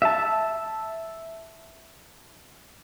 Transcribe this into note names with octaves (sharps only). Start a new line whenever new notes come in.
E5 A5